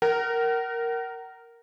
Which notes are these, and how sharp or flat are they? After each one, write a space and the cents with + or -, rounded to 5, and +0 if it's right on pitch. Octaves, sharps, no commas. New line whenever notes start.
A#4 -5 F#5 +40